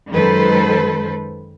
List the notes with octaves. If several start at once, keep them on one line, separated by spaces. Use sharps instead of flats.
F#2 D#3 G#3 A4 B4 C5